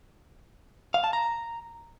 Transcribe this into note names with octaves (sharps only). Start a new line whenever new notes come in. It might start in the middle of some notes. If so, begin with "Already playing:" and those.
F5
A5
A#5